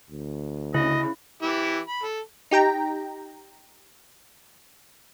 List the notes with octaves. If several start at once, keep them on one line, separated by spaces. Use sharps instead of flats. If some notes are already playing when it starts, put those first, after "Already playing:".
D2
C#3 E4 D#5
E3 E4 G4
B5
A4
D#4 G4 G5 A#5